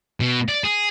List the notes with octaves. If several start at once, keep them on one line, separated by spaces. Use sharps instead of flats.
B2
D5
G#4